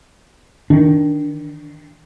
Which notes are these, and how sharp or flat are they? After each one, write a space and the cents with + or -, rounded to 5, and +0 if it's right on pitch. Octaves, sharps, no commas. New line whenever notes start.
D#3 +10 D4 +0